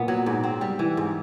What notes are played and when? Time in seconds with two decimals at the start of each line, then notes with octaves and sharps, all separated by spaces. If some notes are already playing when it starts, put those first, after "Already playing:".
Already playing: A#2 B3
0.08 F#3
0.26 G#2
0.44 C4
0.61 G3
0.79 E3
0.97 G#2